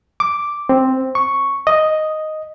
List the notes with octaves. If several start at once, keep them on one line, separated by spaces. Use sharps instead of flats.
D6
C4
C#6
D#5